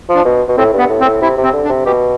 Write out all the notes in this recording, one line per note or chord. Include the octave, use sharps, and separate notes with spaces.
F3 D4
B2
B2
A2 C4
G2 B3
A2
C4
A2
C3 E4
C3
C4
D3
D4
C3
B2 G4